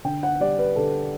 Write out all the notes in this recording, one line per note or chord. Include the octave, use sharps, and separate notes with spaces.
D3 G5
F#5
G3 D5
B4
D3 A4